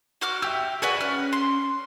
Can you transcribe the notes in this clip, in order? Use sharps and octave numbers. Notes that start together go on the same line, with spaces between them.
F#4 D6 F6
G4 E5 G5 E6
F#4 G#4 B4 D5 F#5 G#5
C#4 F6 F#6
C6